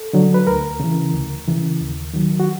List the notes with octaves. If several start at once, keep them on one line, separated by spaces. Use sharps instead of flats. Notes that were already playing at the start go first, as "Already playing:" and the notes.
Already playing: A4
D3 F#3
B4
D2 A#4
C#3 E3
D2
C#3 E3
D#2
D#3 F#3
F#4